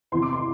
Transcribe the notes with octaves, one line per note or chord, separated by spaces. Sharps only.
E2 C3 E3 C6
D6
C6